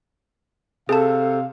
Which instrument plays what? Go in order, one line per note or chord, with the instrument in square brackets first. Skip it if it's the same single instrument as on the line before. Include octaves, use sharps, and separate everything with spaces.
[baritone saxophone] C3 [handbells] G#4 A5 [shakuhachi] A4 [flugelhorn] F5